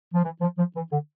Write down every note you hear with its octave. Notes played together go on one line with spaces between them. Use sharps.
F3
E3
F3
F3
E3
D3